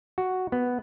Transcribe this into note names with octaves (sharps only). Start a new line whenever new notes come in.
F#4
B3